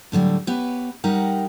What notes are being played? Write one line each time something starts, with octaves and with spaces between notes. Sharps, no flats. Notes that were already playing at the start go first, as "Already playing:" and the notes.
A2 D3 F#3 G3
B3 G4 B4 C#5
G3 D#4 G4 A#4 F#5